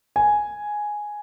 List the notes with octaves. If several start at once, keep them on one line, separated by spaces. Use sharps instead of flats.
G#5